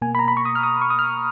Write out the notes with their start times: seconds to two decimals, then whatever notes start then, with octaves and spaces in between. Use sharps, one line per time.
0.01 B2 A#3 G#5
0.15 B5
0.19 A#5
0.28 B5
0.37 C#6
0.45 D#6
0.55 F6
0.63 D#6
0.82 C#6
0.90 D#6
0.99 F6